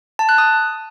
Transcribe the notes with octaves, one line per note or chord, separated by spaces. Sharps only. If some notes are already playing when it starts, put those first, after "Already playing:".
A5
F#6
D#6